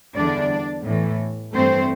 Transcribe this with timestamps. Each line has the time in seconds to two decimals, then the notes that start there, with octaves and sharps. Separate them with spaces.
0.16 E2 D3 G3 D4 D5
0.86 A2 E3 A3
1.54 G2 E3 A3 C4 C5